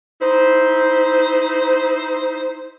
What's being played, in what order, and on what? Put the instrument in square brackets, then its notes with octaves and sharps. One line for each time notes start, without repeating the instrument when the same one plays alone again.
[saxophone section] D#4 E4 C5